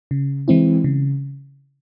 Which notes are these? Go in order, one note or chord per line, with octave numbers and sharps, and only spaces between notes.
C#3
E3 G#3 C4 E4
C#3